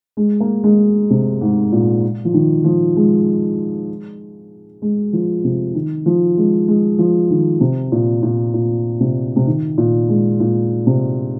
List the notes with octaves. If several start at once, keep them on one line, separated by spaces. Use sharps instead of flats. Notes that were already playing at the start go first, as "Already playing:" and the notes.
G#3
A#3
G#3
C3
G#2
A#2
F3
D#3
F3
G#3
G#3
F3
C3
D#3
F3
G#3
G#3
F3
D#3
C3
A#2
A#2
A#2
C3
C3
D#3
A#2
G#3
A#2
C3